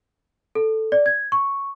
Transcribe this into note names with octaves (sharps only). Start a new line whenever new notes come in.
A4
D5
G#6
C#6